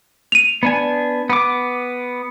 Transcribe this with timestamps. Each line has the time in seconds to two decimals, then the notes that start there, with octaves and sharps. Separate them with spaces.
0.32 D#7 F7
0.63 B3 D4 G#5
1.30 B3 D6